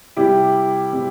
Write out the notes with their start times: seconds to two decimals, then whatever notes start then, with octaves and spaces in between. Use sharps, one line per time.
0.17 C3 G3 E4 G4
0.93 C3 G3